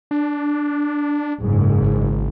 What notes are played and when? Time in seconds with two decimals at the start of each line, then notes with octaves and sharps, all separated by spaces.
0.11 D4
1.41 F#1 G#2
1.82 G#1